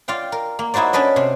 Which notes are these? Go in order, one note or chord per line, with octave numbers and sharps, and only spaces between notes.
F4 D5 F5 G5
A#4
A#3
D#4 E4 F#4 C5 D5
C#4 D4 B4 D5 D#5
C3 C5